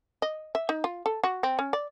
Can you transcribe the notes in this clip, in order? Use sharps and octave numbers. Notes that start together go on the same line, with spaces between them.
D#5
E5
D#4
F4
A4
F#4
C4
C#4
D5